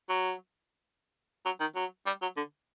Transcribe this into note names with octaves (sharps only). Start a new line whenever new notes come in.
F#3
F#3
D#3
F#3
G3
F#3
D3